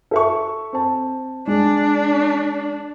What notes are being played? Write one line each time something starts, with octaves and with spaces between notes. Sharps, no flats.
A4 E5 C#6
C4 A5
G#3 D4